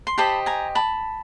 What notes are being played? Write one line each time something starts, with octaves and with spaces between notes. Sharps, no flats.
C6
G4 C5 D#5 A5 B5
G#5 A#5
A5 B5